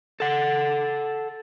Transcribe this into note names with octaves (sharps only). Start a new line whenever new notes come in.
A4 F#5